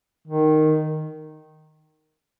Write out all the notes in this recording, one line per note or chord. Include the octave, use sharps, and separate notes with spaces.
D#3